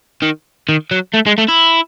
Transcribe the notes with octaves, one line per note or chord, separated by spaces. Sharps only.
D#3
D#3
F#3
A3
G#3
A3
E4